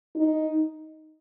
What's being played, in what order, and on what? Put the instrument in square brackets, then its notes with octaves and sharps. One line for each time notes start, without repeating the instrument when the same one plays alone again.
[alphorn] D#4